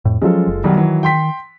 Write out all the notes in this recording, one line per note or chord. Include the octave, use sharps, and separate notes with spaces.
F2 A2
F3 F#3 G#3 C#4 F4 A4
F#1
B1 D#3 F#3 G3
E3 F#3
G5 C6 B6